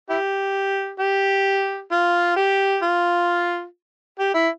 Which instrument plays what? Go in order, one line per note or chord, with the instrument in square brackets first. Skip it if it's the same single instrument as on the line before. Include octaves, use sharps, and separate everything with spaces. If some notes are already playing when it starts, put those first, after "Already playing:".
[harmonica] E4 G4
G4
F4
G4
F4
G4
E4